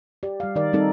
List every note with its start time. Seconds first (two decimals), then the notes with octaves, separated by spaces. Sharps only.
0.23 G4 D5
0.40 G3 F5
0.55 D#3 D#4 A#4 D5
0.73 G3 C4 D#4 A4